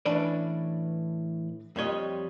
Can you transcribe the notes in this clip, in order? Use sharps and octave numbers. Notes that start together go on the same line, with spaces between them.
A2 E3 C#4 D4 B4 D5
F2 F3 G3 C#5 D#5